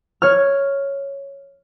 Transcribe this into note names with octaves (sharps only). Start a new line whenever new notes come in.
C#5 F6